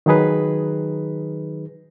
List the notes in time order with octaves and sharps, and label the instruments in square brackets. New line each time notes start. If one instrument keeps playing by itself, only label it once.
[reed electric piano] D#3 F#3 D#4 G#4 B4